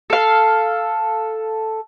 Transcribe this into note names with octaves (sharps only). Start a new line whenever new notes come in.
A4 F5